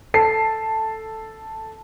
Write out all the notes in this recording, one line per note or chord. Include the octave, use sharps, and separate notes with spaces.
A4 A5 C7